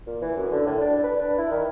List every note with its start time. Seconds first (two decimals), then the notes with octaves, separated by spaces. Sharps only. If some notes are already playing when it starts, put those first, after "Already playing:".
0.07 A#2
0.22 E3
0.37 F#2
0.51 D3
0.66 A2
0.81 D4
1.03 B4
1.21 D4
1.38 E4
1.51 D#3